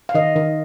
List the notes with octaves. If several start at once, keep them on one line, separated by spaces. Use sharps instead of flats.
F5
D#3 D#5
D#3